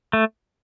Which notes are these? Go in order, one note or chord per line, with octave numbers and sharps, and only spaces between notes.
A3